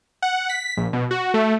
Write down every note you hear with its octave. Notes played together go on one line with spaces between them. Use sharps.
F#5
B6
A#1
B2
F#4
A3